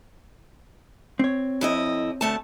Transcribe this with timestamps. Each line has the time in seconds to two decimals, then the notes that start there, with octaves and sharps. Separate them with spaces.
1.19 C4 C#5
1.61 F2 E4 D#5
2.21 D2 A3 A5